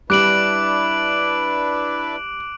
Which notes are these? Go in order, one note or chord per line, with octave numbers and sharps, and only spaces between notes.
G3 D4 E4 B4 D6 F#6 D7 F#7